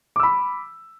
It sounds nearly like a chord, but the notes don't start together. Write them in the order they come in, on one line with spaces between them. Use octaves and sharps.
D6 E6 B5